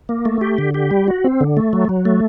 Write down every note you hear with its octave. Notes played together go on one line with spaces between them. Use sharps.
A#3
A3
G4
D3
G4
G3
F#4
C4
D3
A3
F#3
F#3
A3